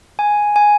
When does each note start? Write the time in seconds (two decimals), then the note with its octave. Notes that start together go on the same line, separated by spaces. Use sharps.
0.19 G#5
0.56 G#5